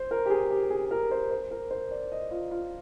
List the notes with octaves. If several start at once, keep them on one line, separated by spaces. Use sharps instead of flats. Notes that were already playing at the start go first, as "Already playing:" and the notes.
Already playing: C5
A#4
G4
G#4
G4
G#4
A#4
C5
C5
A#4
C5
D5
D#5
F4
F4